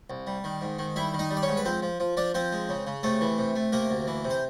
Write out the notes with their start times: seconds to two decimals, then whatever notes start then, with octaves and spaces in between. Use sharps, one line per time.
0.10 C2
0.27 G3
0.44 D#3
0.62 G#2
0.79 D#3
0.96 G3 E4 E5
1.14 D#3
1.19 D#4 D#5
1.30 G3
1.37 D5
1.42 C#4 C#5
1.48 G#2
1.57 B4
1.65 F3 C4 C5
1.82 F3
2.00 F3
2.17 F3 D4 D5
2.34 F3 C4 C5
2.52 G#3
2.69 C#3
2.87 C#3
3.03 C3 A3 A4
3.21 E3
3.38 C3
3.56 A3
3.72 C3 A#3 A#4
3.90 D2
4.07 E3
4.25 C3
4.30 C5